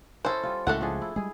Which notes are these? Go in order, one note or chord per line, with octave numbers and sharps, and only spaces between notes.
C#4 E4 A4 C5 D#5
G3 F4
C#2 A2 A3 F#4 A4 F#5
F3 D4 G#4
E4
G3 G#3 G#4